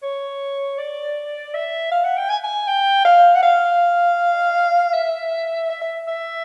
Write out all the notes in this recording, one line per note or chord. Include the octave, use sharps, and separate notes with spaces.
C#5
D5
E5
F5
F#5
G5
G#5
G#5
G5
F5
F#5
F5
E5
E5
E5
E5